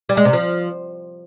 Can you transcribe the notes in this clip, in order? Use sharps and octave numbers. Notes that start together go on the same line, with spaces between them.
G3
G#3
C3
F3